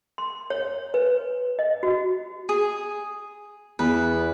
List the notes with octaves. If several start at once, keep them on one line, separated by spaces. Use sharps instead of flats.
C6
C#5
B4
D#5
F#4
G#4
E2 B4